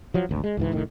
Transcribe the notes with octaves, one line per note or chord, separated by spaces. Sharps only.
F3 F#3
G#1 D2
G#3
C#2 G#2 E3
F1 A2 D#3